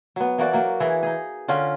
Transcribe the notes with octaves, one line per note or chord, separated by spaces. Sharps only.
F#3 B3
E3 A#3 F#4 D5
F#3 A#3
E3 E4 G#4
D#4 G#4
D3 C#4 F4 G5